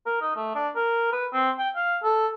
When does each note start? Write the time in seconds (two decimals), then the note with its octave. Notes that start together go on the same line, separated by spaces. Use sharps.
0.06 A#4
0.21 D#4
0.36 A3
0.55 D4
0.76 A#4
1.12 B4
1.33 C4
1.58 G5
1.75 F5
2.03 A4